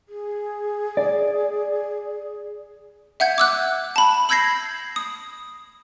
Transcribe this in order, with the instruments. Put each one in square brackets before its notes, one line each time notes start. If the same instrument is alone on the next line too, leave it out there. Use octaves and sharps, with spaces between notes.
[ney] G#4
[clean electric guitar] D5
[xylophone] E5 F#5 G6 G#6
D6 E6 F#6
A5 B5
B5 E6 G6 G#6 A#6 C7
D#6